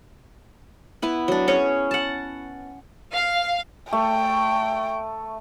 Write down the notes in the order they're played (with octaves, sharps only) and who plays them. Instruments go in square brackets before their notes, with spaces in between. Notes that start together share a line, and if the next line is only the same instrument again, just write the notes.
[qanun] B3 E4 B4
F#3 D4
C#4 G#4 C#5
F#5 A5
[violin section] F5
[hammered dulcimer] A3 [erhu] G5